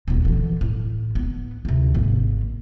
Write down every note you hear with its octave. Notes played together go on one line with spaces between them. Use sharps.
D#1 B3
D3 E3
A2
B3
D2 C3
G#1 A#3